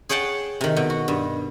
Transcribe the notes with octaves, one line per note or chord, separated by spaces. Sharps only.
G#4 C#5 F#5 G5 A5
C3 D#3
B2
F#4
G2